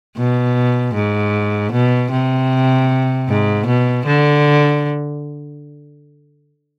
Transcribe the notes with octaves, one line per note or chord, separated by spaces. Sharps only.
B2
G#2
B2
C3
G#2
B2
D3